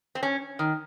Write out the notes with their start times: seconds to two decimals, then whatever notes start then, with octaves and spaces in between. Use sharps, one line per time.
0.15 C4
0.23 C#4
0.59 D#3